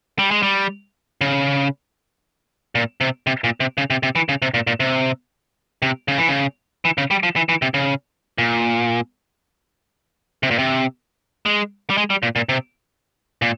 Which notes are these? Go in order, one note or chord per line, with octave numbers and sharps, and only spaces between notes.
G3
G#3
G3
C#3
A#2
C3
C3
A#2
C3
C#3
C3
C3
E3
C#3
C3
A#2
A#2
C3
C3
C#3
E3
C#3
E3
C#3
G3
F3
E3
E3
C3
C#3
A#2
C3
A#2
C3
G#3
G3
G#3
G3
A#2
A#2
C3
A#2